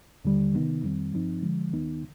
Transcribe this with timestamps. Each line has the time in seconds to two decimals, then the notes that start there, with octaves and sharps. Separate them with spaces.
0.25 D#2 D3 G3
0.54 C3 D#3 B3 D#4
0.83 F2 D#3 G3 C4
1.13 G2 F3 C4 D#4
1.43 D3 F3 G#3
1.73 D#2 D#3 B3 D#4